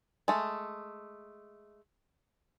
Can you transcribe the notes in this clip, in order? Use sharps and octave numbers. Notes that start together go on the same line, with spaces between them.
G#3 A3